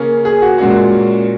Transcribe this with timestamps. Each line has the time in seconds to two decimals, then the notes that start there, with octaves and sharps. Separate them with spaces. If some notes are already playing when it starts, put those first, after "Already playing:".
Already playing: C#3 A#3 C#4
0.25 G#4
0.42 F#4
0.58 A#2 G#3 C#4 F#4